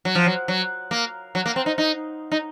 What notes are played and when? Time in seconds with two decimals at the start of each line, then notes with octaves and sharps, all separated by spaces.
0.05 F#3
0.15 F3
0.26 F#3
0.48 F#3
0.91 A#3
1.35 F#3
1.46 A#3
1.56 C4
1.66 D#4
1.78 D#4
2.32 D#4